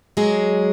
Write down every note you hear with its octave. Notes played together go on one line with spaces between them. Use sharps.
F#3 G#3 G#4